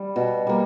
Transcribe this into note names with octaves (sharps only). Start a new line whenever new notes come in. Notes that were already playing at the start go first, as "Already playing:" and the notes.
Already playing: G3
B2
G3 A#3